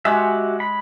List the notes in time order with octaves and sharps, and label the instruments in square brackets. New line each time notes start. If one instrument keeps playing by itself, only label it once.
[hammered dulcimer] G#3 [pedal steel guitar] F#4 G4 E5
[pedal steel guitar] B5